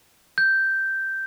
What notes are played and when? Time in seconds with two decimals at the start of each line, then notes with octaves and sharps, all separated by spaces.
0.38 G6